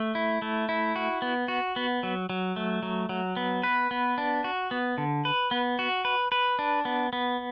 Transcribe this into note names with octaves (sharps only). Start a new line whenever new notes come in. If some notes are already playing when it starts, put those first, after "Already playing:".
Already playing: A3
E4
A3
E4
F#4
B3
F#4
B3
F#3
F#3
A3
F#3
F#3
B3
B4
B3
D4
F#4
B3
D3
B4
B3
F#4
B4
B4
D4
B3
B3